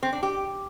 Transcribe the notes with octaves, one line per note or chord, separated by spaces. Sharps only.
C4
D4
G4